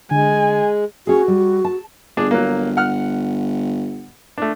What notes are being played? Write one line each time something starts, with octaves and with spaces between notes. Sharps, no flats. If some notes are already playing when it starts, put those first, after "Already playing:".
D3 G#3 G#5
C#4 F#4 G#4
G3
A5
G1 D4 G#4
F#3 A#3
F#5 F6
A3 D4